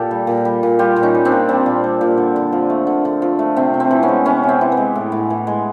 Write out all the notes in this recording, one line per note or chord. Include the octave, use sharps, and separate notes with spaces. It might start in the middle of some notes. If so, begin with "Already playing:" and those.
Already playing: A#2 G4 A4
G3
A#2
G3
A#2
G3 F4 G4
A#2
C#4 D#4
G3
C4 D4
A#2
G3 C4
A#2
G3
A#2
D3
D3
F3
A3
D3
D3
F3
A3
C3 C4
C3
C4
E3
B3 C#4
G#3
C3 B3 C#4
C3
C4
E3
B3
G#3
A2
A2
E3
G#3